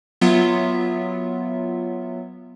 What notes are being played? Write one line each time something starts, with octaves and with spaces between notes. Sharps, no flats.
F#3 B3 F4 E5